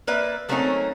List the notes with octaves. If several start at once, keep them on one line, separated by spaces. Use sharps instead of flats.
A#3 B4 D5 E5
F#3 A3 A#3 C4 C#4 D#4